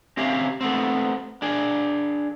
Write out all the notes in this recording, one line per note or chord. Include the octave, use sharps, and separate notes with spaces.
C4 C#4 G4 C#5 E5 F5
A3 B3 C4
D4 G#4